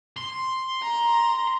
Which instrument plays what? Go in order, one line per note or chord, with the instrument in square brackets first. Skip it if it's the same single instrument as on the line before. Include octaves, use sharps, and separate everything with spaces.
[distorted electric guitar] C6
[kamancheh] A#5